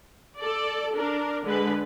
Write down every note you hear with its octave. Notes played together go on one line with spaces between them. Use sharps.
A4 D5
D4 A#4
D3 G#3 B4